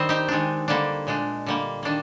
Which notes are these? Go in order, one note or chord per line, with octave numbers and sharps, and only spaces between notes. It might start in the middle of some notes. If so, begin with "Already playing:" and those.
Already playing: D#3 G3 C4 C5 D#5
D#4 G4
D#3 G#3 D4
D3 G3 A#3 D4
A#2 G#3 D4
D3 G3 A#3
D#3 A#3 D4